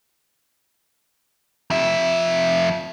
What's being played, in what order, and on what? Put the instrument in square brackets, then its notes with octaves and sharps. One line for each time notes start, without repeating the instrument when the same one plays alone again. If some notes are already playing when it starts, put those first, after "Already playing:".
[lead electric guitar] F2 E5